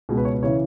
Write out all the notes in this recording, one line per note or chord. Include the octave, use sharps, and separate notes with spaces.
C#2 B2 G#4
B4
C#5
B4
C#3 E3 C#5